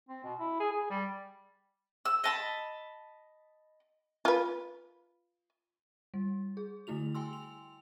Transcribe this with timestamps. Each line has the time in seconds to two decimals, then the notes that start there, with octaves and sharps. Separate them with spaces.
0.09 C4
0.24 B2
0.39 E4
0.60 G#4
0.71 G#4
0.90 G3
2.05 E6
2.24 D#5 A5 B5
4.25 F4 B4
6.14 G3
6.57 G#4
6.87 D3 A3 E4 F#4 F7
7.15 G5 G#5 C6 E6
7.33 F7